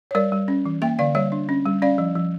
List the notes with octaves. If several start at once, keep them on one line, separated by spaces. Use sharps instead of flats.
C#5
G3 A#4 D5
G3
C#4
E3
A#3 E5 G5
D3 D5 F5
G3 C#5 E5
D4
C#4
G3
C#4 D5 F5
F3
F3